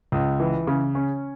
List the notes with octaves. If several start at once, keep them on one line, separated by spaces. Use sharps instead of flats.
C#2
E3
C#3
C#4